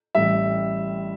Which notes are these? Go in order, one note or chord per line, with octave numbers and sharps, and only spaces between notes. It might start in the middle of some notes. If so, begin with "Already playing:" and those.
A1 A2 G3 E5